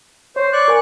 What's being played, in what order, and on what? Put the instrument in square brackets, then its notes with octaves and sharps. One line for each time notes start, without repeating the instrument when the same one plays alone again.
[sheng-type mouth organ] C5 [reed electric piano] C#5
[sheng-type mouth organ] D5 C#6 F#6
[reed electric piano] A#4 G#5